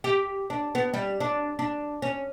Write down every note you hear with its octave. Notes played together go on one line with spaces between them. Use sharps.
G4
D4
B3
G3
D4
D4
C#4